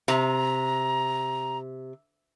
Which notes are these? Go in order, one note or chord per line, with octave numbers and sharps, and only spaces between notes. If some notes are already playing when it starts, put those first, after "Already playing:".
C3 A#5